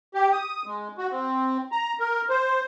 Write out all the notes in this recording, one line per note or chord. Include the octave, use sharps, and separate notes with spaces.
G4
D#6
G#3
F#4
C4
A#5
A#4
C5